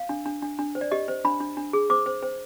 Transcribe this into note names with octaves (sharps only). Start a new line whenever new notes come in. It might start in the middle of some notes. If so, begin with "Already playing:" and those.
Already playing: F5
D4
D4
D4
D4
C5
D5
G4 D#5
C5
D4 B5
D4
D4
G#4
C5 D6
C5
C5